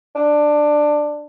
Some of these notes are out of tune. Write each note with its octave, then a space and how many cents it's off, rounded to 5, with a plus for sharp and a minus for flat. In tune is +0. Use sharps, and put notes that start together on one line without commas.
D4 +15